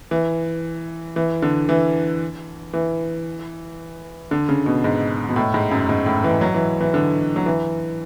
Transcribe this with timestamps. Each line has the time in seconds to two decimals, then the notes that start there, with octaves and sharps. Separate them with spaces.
0.11 E3
1.16 E3
1.42 D3
1.69 E3
2.74 E3
4.31 D3
4.49 C#3
4.66 B2
4.84 G#2
5.29 B2
5.36 A2
5.54 G#2
5.71 F#2
5.89 G#2
6.06 A2
6.24 E3
6.41 F#3
6.54 E3
6.81 E3
6.94 D3
7.36 F#3
7.46 E3